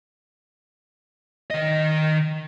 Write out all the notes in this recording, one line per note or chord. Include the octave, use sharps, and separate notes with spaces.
D#3 D#5